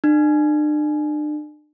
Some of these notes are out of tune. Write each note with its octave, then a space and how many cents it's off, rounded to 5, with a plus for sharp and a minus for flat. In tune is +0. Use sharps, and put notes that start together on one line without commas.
D4 +40